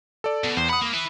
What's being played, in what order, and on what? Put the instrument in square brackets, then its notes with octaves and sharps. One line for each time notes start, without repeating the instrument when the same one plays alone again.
[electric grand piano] A4 D5
[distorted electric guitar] B2
[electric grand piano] E2 [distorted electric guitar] C5
[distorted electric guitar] F#5 [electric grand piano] B5 D#6
[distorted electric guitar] A#3
E4 B4